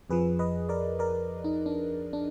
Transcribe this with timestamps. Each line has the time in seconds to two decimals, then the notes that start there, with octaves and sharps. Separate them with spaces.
0.10 F2 F3 G#4 B4
0.39 B4 D#5
0.69 A#4 D5
0.99 A#4 D5
1.44 D#4
1.66 D4
2.13 D4